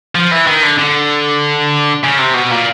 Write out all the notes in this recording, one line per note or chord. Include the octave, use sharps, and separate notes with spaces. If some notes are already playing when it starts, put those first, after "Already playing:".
F3
E3
D#3
D3
D3
C#3
C3
B2
A#2